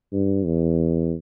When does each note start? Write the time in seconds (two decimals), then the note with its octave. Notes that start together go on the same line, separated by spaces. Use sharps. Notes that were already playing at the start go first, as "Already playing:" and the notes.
0.13 G2
0.46 E2